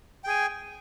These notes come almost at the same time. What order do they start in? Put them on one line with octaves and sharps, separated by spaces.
G5 G#4 G#5